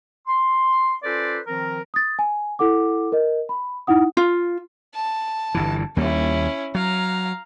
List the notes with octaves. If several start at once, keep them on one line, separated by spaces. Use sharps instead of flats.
C6
C#4 F4 A4 B4 C5 D5
D#3 F3 C4 A#4
D#6 A6
G#5
E4 A4 F#5 D6
A#4 D#5
B5
D#4 E4 F#5 D#6
F4
A5
G1 G2 E3
D#2 G3 A#3 C#4 E4
F#3 F5 A#5